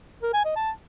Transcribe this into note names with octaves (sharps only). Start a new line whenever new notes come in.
A#4
G#5
D#5
A5